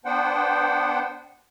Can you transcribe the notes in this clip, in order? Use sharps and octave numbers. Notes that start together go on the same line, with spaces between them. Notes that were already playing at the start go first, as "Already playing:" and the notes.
B3 D4 C5 F#5 G5